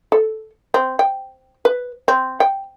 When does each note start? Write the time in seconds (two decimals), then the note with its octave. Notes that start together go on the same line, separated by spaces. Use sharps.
0.12 A4
0.74 C4
0.99 G5
1.65 B4
2.08 C4
2.40 G5